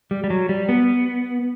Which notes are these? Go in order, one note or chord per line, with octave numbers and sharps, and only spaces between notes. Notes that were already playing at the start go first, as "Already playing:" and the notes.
G3
G3
F#3
G3
B3